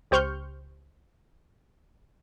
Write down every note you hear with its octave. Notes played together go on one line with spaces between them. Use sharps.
C#2 G4 C5 C#6 F6 G6